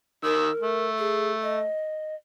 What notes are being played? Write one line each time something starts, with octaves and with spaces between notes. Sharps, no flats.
D#3 A#4 E6
A3
G#4
D#5